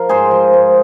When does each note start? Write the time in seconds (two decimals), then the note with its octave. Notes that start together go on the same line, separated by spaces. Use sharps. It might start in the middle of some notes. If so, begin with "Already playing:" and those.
Already playing: F3 A#4
0.09 G#2 G#4 C5
0.31 F3
0.53 G#2